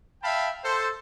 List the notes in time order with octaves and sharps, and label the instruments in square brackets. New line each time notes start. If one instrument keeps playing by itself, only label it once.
[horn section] E5 F5 G5 A5 B5
A4 C5